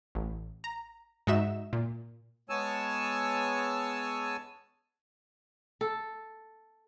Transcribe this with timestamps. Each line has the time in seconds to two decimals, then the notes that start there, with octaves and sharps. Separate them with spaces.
0.15 A1
0.64 A#5
1.27 G#2 G#3 D#4 F#4 E5 E7
1.73 A#2
2.49 G#3 B3 C#5 G#5 A5 E6
5.81 A4